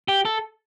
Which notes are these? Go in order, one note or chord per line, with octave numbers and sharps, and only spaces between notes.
G4
A4